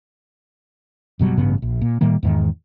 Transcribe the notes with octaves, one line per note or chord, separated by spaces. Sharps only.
F#1 B2 F#3 G3
A1 G2 C#3 B3
A#1
A#2
A2 D#3 G3 A#3
E2 G#2 D#3